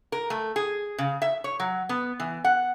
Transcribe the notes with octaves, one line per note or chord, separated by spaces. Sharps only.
A#4
A3
G#4
C#3
E5
C#5
F#3
B3
E3
F#5